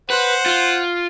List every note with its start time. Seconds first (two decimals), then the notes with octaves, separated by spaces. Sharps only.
0.10 B4 C5 F#5
0.46 F4